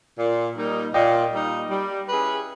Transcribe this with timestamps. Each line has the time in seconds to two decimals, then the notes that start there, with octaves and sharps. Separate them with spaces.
0.18 A#2
0.56 G3 A#3 D#4
0.94 A#2 D#5 G5
1.32 G3 A#3 D#4
1.70 G3
2.09 C#4 E4 G#4 B4